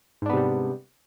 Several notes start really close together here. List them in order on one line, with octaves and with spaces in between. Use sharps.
G#2 D4 B3 C3 G3